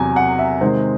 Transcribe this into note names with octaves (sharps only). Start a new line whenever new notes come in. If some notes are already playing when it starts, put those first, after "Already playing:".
Already playing: E2 C3 F#3 G#5
F#5
E5
C3 D#3 G#3 C5